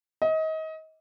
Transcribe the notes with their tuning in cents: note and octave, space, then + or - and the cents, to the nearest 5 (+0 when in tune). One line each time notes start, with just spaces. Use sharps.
D#5 +30